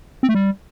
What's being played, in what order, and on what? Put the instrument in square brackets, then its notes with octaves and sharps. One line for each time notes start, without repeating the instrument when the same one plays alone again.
[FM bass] C4
A3
G3